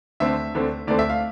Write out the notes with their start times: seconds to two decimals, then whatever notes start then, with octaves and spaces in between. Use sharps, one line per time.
0.20 D2 D3 A3 C4 E5
0.54 D2 D3 A3 C4
0.87 D2 D3 A3 C4 D5
0.99 E5
1.10 F5